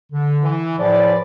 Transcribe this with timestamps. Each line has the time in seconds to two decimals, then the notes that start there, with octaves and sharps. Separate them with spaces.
0.12 D3
0.42 E3
0.78 A2 F3 G#4 B4 D5